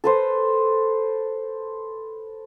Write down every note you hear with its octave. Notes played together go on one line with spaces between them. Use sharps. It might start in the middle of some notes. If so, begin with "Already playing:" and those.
A4 B4 C5